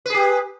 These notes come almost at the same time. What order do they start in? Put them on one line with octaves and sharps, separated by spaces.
B4 G#4 G4